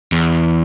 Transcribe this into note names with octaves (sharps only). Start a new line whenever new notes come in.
E2